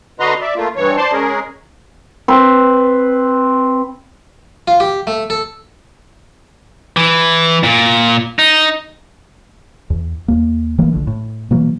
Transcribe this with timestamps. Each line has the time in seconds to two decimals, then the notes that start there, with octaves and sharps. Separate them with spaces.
0.20 D3 F#4 B4 D#5 A#5 C6
0.41 D5 E5
0.56 A3 A#3 F4
0.76 G2 E3 C#5
0.97 C5 D5 A5 C6
1.12 G#3 C#4 G#4 A#4
2.28 C4 B4
4.68 F4
4.80 G4
5.07 A3
5.30 A4
6.97 E3
7.64 A#2
8.39 D#4
9.90 E2
10.28 D#2 A#3
10.78 D#3 E3 A3 A#3
10.93 A#1 D3
11.07 A2
11.51 B2 E3 F#3 A#3